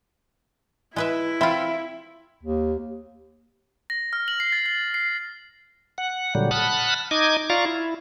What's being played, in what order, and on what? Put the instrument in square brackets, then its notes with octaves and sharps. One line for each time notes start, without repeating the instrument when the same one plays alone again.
[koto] G#3 B4 E5 [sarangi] E4
[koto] C4 F4 [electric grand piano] E5 B5
[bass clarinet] D#2
[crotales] A#6
F6
F#7
C7
A6
A6
C7
[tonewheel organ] F#5
A#2 D3 F#3 G3
F#5 A5 B5 D#6 F6 F#6
D#4 D#5 D6 G#6
F4 D5 F5 A#5 C#6
E4